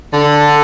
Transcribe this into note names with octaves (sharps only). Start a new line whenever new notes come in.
D3